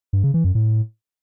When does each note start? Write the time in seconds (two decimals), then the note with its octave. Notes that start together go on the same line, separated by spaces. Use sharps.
0.13 G2
0.23 C#3
0.34 E3
0.44 F#2
0.55 A2